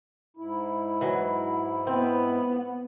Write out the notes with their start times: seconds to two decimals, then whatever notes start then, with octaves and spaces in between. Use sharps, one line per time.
0.37 G#2 E4
1.01 E3 F#3
1.87 B3 C4